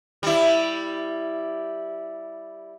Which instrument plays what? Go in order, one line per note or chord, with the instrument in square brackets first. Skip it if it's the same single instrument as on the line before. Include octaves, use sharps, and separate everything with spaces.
[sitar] G3 E4